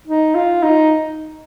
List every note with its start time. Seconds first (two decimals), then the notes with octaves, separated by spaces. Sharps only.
0.07 D#4
0.35 F4
0.63 D#4